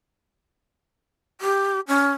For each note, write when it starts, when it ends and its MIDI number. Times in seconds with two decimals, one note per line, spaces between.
1.41 1.80 67
1.88 2.11 61